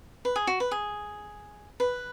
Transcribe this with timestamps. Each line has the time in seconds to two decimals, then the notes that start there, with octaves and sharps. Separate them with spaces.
0.25 B4
0.36 G#4
0.47 F#4
0.60 B4
0.71 G#4
1.80 B4